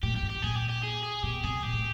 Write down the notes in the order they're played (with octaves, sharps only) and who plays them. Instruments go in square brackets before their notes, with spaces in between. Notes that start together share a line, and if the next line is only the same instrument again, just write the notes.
[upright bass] A2 [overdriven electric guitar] G4
[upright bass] G2 [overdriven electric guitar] G4
[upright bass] G#2
[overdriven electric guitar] G4
[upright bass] A#2 [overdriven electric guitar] G#4
[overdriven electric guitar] G4
G4
G#4
G#4
[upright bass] B2 [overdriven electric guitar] G4
[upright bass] C3 [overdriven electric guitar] G#4
[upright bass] A#2 [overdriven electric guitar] G4
[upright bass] A2